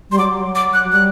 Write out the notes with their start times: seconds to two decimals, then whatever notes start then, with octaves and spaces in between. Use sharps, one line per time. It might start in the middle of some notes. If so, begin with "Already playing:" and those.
0.10 G3 C6
0.18 F#3 D6
0.55 D6
0.73 F#6
0.92 G3 F#6